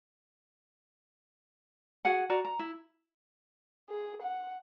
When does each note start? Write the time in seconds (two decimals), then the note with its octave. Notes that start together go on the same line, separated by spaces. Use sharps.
2.05 F#4 G#4 F#5
2.30 F#4 D5 A#5
2.45 A#5
2.59 E4
3.89 G#4
4.22 F#5